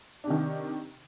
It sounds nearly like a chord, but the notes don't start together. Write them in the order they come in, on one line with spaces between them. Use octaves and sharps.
D4 C3 D#3